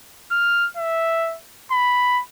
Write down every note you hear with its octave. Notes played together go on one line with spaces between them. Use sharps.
F6
E5
B5